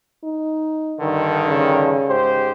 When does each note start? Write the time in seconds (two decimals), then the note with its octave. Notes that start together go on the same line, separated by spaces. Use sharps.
0.24 D#4
1.00 G2 D3 D#3
1.48 C#3
2.08 G#2 G4 C5